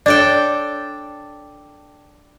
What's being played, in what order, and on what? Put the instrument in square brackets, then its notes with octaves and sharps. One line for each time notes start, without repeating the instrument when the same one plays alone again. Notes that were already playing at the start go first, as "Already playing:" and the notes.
[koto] D4 A4 G5 [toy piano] C#5 D5